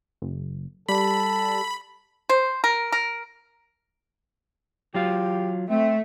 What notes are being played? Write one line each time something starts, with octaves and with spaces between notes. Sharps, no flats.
F#1
G3 A4 B5
C5
A#4
A#4
F#3 F4 G4 F5
A3 C4 E5